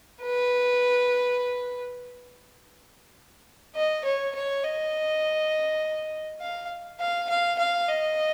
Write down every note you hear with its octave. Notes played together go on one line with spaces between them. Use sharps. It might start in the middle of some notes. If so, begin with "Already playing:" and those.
B4
D#5
C#5
C#5
D#5
F5
F5
F5
F5
D#5